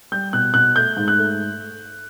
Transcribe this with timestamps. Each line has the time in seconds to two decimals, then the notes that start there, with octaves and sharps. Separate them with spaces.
0.12 G3 G6
0.33 B2 F#6
0.54 B2 F#6
0.76 A3 G6
0.97 G#2
1.08 F#6
1.18 A3